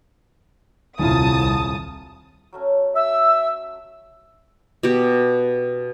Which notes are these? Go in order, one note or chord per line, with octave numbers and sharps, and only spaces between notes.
D#1 C2 E4 F4 A5 D#6
F#3 A3 C#4
E5 E6
B2 G4